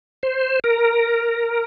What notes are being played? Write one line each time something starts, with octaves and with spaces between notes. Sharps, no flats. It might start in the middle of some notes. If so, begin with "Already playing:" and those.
C5
A#4